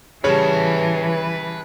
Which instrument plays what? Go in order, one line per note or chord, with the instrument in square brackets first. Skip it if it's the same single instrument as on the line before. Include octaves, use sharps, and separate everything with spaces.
[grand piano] C#3 G3 [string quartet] E3 [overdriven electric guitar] B4 A5 [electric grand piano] C#5